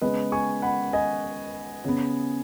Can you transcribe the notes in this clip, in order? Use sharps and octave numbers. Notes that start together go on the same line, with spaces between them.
C#3 G#3 B3 B4 D#5
G#5 C#6
F#5 B5
D#5 G#5
C#3 B3